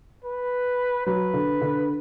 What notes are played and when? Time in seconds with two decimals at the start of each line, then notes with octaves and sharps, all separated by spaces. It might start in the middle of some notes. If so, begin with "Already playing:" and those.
0.24 B4
1.06 F#3 B4
1.34 D3
1.61 D3